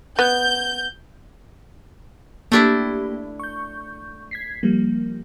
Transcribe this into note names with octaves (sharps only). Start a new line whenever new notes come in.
B3 G6
A3 A#3 D4 E4 G4
C#6 G6
G#6 B6 C7
F3 G3 A#3